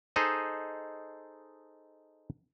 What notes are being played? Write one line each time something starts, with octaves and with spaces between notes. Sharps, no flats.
D#4 G#4 A4 C5 D#5